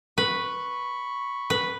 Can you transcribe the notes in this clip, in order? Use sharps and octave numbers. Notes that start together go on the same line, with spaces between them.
B4 B5 C#6
B4